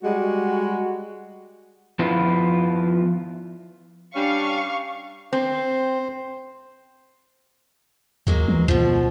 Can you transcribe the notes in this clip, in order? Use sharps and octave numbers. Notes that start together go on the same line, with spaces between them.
G3 G#3 F#4
F3 B3 E4 F4
G3 C#4 D4 F5 C#6
C4 C5
D#2 F#3 G#3 A#3
E3
C#2 B2 F3